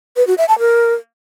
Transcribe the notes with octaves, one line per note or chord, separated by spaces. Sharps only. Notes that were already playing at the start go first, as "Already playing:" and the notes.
B4
F#4
E5
A5
A#4